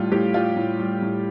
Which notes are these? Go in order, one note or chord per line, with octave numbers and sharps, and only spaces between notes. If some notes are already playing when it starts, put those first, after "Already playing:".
Already playing: A2 G3 F4
A2 G4
G3 F4
A2
G3
A2